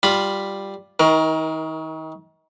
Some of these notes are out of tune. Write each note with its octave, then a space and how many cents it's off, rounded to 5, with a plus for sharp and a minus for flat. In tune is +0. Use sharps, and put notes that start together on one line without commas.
G3 +0 F4 +0 B5 +0
D#3 +35 A#4 +15